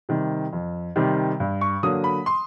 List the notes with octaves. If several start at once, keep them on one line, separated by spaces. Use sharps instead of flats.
C3 D#3 G3
F2
C3 D#3 G3
G2
C#6
D3 F#3 A#3 D#6
B5
C6